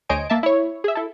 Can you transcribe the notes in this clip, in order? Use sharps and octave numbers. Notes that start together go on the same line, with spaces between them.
D2 C5 C#5 D#5 G#5 D7
A#3 E5 A5
E4 C#5
G#4 E5
E4 A4